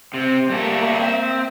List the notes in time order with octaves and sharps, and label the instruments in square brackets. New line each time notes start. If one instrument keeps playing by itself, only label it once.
[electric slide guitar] C3 [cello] C4
[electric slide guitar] G3 A3 G4 [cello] A#3 E5
[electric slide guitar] C4